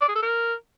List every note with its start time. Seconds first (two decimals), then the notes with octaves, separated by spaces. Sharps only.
0.01 D5
0.08 G#4
0.15 A4
0.22 A#4